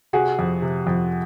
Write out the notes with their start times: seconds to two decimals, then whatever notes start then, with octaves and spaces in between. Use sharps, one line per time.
0.13 C3 F#4 G#4
0.39 F2
0.62 C3
0.87 F2